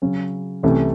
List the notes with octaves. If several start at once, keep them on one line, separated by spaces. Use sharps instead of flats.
C#3 F#3 C#4
C2 C3 E3 A3 C#4